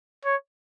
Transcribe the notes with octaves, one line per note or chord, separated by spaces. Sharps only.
C#5